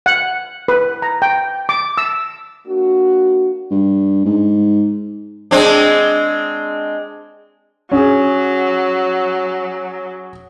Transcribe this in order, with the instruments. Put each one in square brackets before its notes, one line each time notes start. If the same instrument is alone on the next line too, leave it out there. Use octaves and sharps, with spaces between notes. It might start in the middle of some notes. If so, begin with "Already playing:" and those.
[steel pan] F#5
B4
A#5
G5
D6
E6
[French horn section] A#3 D4 F#4
[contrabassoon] G2
G#2
[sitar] G#3 C4 D4
[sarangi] F#3 [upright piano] C#4 G#4